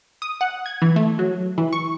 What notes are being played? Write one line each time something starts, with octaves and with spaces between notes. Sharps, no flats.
D#6
F#5
G#6
E3
A3
F#3
E3
C#6